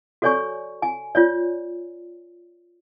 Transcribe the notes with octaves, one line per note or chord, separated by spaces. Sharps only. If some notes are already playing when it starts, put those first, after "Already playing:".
F#4 A4 C#5 D5 G#5 C#6
G#5
F4 C#5 D5